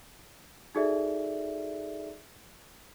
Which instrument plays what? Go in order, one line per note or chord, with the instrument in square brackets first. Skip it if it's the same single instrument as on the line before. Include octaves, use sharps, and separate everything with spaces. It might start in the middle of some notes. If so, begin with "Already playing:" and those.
[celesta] D#4 F#4 G#4 A4 D5 E5